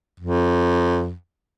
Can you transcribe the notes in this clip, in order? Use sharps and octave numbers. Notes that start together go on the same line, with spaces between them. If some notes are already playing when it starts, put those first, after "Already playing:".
F2